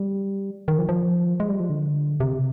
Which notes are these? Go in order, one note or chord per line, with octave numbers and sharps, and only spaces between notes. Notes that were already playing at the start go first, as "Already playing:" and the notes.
Already playing: G3
D#3
F3
F3
G#3
G3
F3
D3
C3